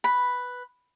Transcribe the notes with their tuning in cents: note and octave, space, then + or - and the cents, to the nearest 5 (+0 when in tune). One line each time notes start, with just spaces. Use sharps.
B4 +0 B5 +0